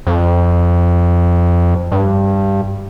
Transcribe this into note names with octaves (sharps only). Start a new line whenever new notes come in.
F2
G2